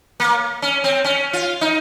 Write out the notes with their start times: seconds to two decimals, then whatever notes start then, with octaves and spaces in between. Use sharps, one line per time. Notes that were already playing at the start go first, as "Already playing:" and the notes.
0.20 A#3
0.62 C#4
0.84 C4
1.05 C#4
1.33 F4
1.61 D#4